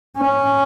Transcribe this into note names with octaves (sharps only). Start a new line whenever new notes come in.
C#4